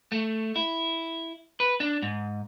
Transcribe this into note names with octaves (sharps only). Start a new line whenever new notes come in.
A3
E4
B4
D4
G#2